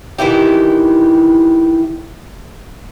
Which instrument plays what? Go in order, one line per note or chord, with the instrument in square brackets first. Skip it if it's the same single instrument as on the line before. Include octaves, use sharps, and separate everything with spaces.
[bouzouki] D#3 E3 E4 G4